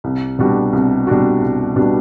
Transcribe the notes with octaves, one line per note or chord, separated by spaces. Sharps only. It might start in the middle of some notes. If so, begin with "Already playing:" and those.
C2
B2 G3 D4 F#4
C2
B2 G3 D4 F#4
C2
B2 G3 D4 F#4